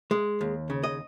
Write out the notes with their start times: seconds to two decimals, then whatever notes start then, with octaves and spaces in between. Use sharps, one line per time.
0.11 G#3
0.41 D#2
0.70 C#3
0.84 D#5